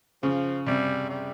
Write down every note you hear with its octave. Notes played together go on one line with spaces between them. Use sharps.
C#3 F3
C3 G3
G3